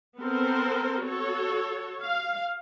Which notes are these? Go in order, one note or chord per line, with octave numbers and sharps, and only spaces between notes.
B3 C4 A4 A#4 C5
F#4 A4 C#5
F5